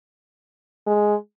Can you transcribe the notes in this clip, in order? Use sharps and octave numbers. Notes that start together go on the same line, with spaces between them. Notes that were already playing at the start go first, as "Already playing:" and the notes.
G#3